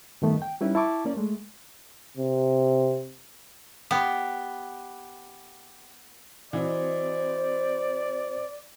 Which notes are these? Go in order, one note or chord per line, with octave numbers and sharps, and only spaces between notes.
G2 D#3 A3 B3
G5
G3 C#4 D#4 E4 B4
E4 A5 C#6 D6
A#3 C#4 D5
G#3 A3
C3
B3 G4
E3 C4 F#4 C5 D5 D#5